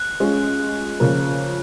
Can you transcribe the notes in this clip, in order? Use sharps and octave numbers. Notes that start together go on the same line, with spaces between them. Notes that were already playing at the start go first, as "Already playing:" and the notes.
Already playing: F#6
G#3 C#4 F4
C#3 F3 A#3